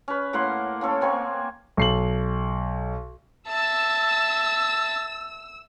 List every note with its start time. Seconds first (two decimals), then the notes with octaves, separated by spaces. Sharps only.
0.08 C#4 B4
0.33 A2 A#3 F#5 C6
0.81 A#3 C#4 A4 C#5
1.01 A#3 C4 C#5 G#5
1.77 B1 C7 F#7
3.48 E5 A5 E6